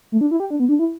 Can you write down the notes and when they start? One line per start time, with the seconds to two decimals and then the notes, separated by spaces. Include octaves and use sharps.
0.12 A3
0.21 D4
0.31 E4
0.40 G4
0.50 D4
0.60 B3
0.69 D4
0.79 E4